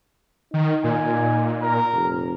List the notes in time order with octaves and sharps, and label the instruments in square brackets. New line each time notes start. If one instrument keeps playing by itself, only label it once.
[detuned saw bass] D#3 [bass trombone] D#4
[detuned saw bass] A#2 [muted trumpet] G#5
[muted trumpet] A#4
[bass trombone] F1